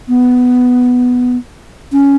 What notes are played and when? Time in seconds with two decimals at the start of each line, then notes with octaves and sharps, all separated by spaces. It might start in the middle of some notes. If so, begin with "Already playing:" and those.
0.09 B3
1.93 C#4